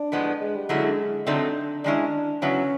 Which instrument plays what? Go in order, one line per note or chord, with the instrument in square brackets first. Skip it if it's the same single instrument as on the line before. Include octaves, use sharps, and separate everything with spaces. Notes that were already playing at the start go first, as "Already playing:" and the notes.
Already playing: [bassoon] D4
[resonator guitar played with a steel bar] A2 F3 G#3 B3
[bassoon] G#3
G3
[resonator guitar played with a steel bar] D3 F#3 A3 C#4 E4 [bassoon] G#3
[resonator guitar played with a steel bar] D3 F#3 A3 C4 D#4 [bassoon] D4
[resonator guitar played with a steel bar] D#3 G#3 C#4 E4 [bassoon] D4
[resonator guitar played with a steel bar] C#3 F#3 B3 E4 [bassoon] C#4